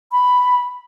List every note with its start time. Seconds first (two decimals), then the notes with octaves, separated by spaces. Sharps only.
0.12 B5